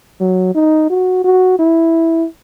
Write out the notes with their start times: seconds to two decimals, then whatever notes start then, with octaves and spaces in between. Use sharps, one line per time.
0.21 F#3
0.55 D#4
0.90 F#4
1.24 F#4
1.59 E4